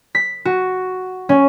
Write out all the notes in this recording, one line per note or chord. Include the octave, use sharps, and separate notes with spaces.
B6
F#4
C#4